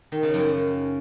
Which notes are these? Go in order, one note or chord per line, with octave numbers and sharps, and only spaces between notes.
D#3
C#3
F#2